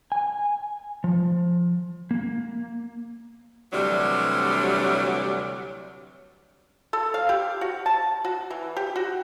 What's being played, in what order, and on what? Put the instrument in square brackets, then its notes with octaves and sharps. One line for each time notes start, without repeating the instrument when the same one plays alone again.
[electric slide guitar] G#5
F3
A#3
[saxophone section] D2 C3 E3 F#3 G3 D4
[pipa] A4
F5
G4
F#4
A5
F#4
E3
G4
F#4